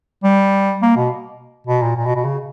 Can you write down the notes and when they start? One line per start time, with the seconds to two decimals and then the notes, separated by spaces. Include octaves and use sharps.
0.24 G3
0.82 A#3
0.97 B2
1.67 B2
1.82 A#2
1.97 A#2
2.06 B2
2.16 B2
2.25 C#3